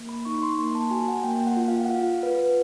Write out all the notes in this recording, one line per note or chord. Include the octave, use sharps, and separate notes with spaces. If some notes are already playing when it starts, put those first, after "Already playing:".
Already playing: A#3
B5
D#4 C#6
C6
A#3 C6
A5
F#4 G#5
F#5
A#3 G5
F#5
F4
F5
F#5
F4 F5
F4 B4